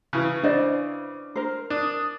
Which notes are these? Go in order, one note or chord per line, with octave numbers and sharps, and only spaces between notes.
C#3 E3
D4 C5 D5 D#5
A#4 C5
D4 D#6